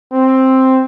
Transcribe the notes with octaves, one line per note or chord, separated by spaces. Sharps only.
C4